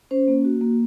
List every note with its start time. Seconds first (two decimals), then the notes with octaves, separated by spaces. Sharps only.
0.11 C#4 C5
0.28 A#3
0.45 F#4
0.61 A#3